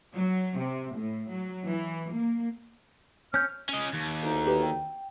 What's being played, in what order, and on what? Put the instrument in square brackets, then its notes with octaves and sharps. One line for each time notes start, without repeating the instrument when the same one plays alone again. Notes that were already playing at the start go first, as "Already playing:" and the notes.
[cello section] F#3
C3
A2
F#3
E3
A#3
[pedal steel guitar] C#4 G6 [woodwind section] C#5 F6
[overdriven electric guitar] C#4 D#5
D#2
[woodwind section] D2 D#4
[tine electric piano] G4 B4
G5